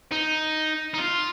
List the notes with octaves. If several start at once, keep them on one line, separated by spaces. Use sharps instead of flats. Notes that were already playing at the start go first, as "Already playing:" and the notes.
D#4
D#4
F4